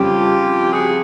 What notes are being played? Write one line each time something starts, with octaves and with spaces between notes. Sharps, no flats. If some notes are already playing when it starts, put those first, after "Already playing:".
Already playing: F2 C#3 G3 F4 G4
F#4 G#4